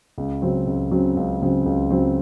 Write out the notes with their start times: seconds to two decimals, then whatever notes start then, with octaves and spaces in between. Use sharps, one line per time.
0.18 C#2
0.42 C#3 F#3 C4
0.67 C#2
0.91 C#3 F#3 C4
1.17 C#2
1.42 C#3 F#3 C4
1.66 C#2
1.91 C#3 F#3 C4